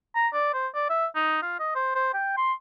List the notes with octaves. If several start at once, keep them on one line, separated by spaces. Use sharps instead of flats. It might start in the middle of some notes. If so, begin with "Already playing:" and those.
A#5
D5
C5
D5
E5
D#4
F4
D#5
C5
C5
G5
C6